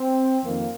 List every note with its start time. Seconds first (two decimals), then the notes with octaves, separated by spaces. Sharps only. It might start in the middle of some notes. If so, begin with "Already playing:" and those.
Already playing: C4
0.44 F2 D#3 A#3